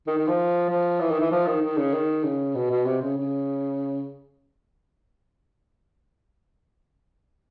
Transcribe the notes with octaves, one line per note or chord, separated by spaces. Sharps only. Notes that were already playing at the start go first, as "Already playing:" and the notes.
D#3
D#3
F3
F3
E3
D#3
E3
F3
D#3
D#3
C#3
D#3
C#3
B2
B2
C3
C#3
C#3